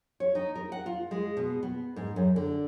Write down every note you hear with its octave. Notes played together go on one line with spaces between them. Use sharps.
C#5
D#4
A#4
F#5
F4
G#3
B2
B3
G#2
F#2
D3